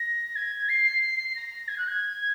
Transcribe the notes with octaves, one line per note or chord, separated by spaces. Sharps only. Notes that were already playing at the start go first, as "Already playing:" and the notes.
Already playing: A#6
G#6
C7
A#6
G#6
F#6
G#6